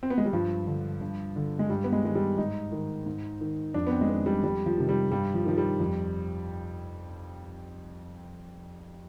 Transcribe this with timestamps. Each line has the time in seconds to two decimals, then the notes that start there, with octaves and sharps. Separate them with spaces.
0.03 C4
0.10 B3
0.18 G#3
0.25 G3
0.33 G2 F3
0.67 D3
1.01 G2
1.36 D3
1.59 G#3
1.70 G2 G3
1.84 B3
1.92 G#3
2.04 D#3 G#3
2.15 G3
2.38 G#2 D#4
2.72 D#3
3.06 G#2
3.41 D#3
3.74 F2 D4
3.87 B3
3.92 C4
4.01 G#3
4.09 D#3 B3
4.26 G3
4.43 F2 G3
4.66 F3
4.77 C3 D#3
4.89 G3
5.12 G2 G3
5.34 F3
5.45 D#3 F3
5.58 G3
5.80 F2